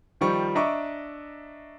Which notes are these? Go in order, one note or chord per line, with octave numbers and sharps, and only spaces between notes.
D#3 F3 G3 C#6
D4 D#5 E5 A#5 C#6 D6